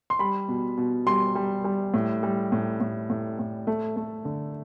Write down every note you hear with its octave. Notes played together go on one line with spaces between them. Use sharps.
C6
G3 B5
B2
B2
G3 C6
G3
G3
A2
G3
A2
A2
A2
A2
A3
A3
D3